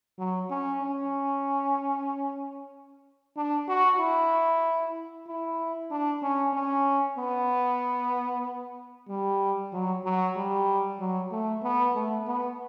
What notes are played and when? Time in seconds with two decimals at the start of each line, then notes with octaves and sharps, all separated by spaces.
0.19 F#3
0.50 C#4
0.83 C#4
3.37 D4
3.68 F#4
4.00 E4
5.27 E4
5.91 D4
6.23 C#4
6.54 C#4
7.18 B3
9.09 G3
9.73 F#3
10.04 F#3
10.36 G3
11.00 F#3
11.32 A3
11.63 B3
11.95 A3
12.27 B3